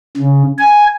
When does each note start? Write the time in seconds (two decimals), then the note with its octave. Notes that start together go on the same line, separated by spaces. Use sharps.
0.17 C#3
0.58 G#5